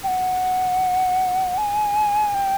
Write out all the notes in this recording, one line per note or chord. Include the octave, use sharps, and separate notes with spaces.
G5
F#5
G#5
G5